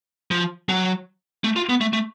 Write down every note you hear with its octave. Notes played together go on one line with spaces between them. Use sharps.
F3
F#3
A3
F4
B3
A3
A3